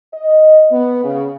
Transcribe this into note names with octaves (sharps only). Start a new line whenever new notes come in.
D#5
B3
C#3